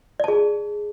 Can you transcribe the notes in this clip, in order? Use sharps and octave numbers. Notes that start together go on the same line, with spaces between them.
G#4 D5 A5